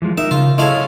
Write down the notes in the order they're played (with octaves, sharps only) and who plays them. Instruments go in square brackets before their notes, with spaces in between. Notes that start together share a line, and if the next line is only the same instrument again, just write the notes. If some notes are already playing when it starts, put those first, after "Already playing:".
[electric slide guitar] E3 F3 G#3
[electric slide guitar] D#4 A#4 [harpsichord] E5
[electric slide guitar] C#3 [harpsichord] F4
[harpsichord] G#3 A3 F5 [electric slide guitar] E4 F4 C#5